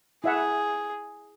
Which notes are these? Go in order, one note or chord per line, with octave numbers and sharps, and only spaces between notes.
E4 G#4 E5 F#5